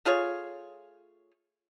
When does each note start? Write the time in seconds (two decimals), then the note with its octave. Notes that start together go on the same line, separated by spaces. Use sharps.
0.05 A3 F4 G#4 C#5